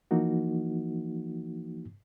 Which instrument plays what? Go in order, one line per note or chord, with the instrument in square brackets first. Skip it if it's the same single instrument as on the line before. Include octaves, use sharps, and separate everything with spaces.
[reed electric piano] E3 F3 A#3 D#4 F#4